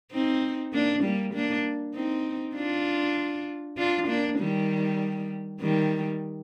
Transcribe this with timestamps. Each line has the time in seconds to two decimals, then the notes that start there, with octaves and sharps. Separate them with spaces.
0.12 C4 D#4
0.73 A#3 D4
1.04 G3 A#3
1.34 A#3 D4
1.95 C4 D#4
2.55 D4 F4
3.77 D4 F4
4.08 A#3 D4
4.39 D#3 G3
5.61 D#3 G3